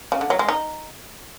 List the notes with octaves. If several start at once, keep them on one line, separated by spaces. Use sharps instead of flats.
C#3
D3
F#3
G#3
D#4